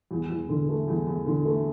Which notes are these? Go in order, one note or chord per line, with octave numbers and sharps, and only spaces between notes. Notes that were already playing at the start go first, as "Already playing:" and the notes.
E2
E2
D3
A3
E2
E2
D3
A3